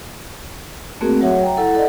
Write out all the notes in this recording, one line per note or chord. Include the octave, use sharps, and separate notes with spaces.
A3 A#3 C4 F#4 G#4 A#4
F#3 F#4 C#5 E5 F#5
G5 A#5
E4 A4 F#5
A4 D5 D#5 F#5